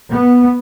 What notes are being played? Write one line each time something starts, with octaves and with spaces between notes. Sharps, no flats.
B3